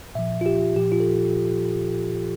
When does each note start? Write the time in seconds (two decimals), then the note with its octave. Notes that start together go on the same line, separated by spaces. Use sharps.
0.15 A#2 F3 E5
0.41 F4
0.46 G4
0.76 A#2 F3 G4
0.92 F4
1.00 A4